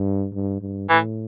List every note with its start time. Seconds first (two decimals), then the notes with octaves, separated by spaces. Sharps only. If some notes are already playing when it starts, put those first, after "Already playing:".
Already playing: G2
0.33 G2
0.61 G2
0.90 A2 E3